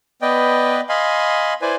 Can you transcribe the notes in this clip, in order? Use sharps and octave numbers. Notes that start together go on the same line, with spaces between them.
B3 B4 D5 D#5 G5
D#5 F5 G#5 B5 C6
E4 B4 C5 D5 G#5